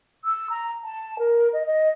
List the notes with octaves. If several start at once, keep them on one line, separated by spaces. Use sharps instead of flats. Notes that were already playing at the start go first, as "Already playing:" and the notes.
E6
A#5
A5
A#4
D#5
D#5